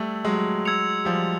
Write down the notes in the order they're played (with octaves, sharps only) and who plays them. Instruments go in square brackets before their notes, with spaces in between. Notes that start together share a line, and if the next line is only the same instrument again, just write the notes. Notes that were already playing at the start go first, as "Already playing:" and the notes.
Already playing: [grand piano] G3 A3 [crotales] E6 G#6 F#7
[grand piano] F#3 G#3
[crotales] E6 G#6 C#7 F7
[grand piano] F3 G3